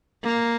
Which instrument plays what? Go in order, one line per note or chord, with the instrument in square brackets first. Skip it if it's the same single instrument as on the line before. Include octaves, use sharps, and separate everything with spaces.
[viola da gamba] A#3